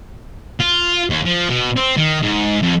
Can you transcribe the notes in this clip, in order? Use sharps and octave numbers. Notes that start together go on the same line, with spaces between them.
F4
D#2
F3
B2
C4
D#3
G#2
F2